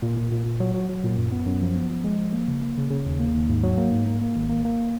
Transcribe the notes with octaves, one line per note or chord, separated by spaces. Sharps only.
A#2
A#2
A#2
A#2
F#3
F#3
F#3
A#2
F#2
B3
F#2
F3
B3
F3
G#3
F3
A#3
C#3
A#3
C#3
C#3
D#2
A#3
D#2
G#2
F#3
A#3
G#2
A#3
A#3
G#1
A#3
A#3